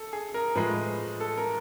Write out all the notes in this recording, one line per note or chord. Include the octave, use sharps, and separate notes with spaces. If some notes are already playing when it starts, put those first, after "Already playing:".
Already playing: A4
G#4
A#4
A2 F3 G#3 B4
A4
A#4